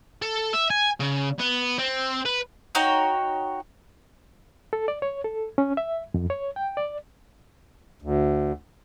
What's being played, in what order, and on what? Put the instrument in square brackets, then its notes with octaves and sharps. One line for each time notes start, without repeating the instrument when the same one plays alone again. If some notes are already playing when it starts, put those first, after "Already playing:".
[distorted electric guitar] A4
E5
G#5
C#3
B3
C4
B4
[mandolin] D#4 F#4 C#5 G5
[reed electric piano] A4
D5
C#5
A4
C#4
E5
F2
C#5
G5
D5
[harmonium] D2